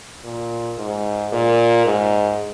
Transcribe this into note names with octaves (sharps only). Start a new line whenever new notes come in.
A#2
G#2
A#2
G#2